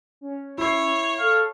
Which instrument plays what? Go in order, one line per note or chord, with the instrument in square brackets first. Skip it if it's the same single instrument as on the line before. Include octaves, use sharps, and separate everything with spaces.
[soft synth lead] C#4
[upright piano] E4 C7 [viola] C#5
[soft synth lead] A4 [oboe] F5